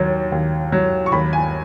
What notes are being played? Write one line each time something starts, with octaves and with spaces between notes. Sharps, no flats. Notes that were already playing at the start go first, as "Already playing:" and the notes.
Already playing: D#2 F#3
D#2
F#3
C#6
D#2 B5
G#5